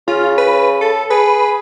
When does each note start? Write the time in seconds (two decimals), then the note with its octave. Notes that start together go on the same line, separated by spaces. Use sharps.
0.08 C#3 F4
0.38 B4
0.81 A4
1.10 G#4 B4